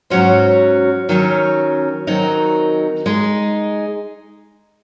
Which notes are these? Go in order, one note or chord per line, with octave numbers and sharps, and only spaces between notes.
G#2 F#3 C#4 F#4 C5
D#3 F#3 C#4
D#3 F#3 C4 D#4 A#4
G#3 D#4 G#4